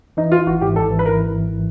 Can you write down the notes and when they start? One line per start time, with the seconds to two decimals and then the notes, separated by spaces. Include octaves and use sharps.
0.17 E3 D#4
0.32 E3 F4
0.46 G#1 F#4
0.61 G#2 G4
0.76 G#1 A4
0.91 E3
0.99 B4
1.06 E3 A#4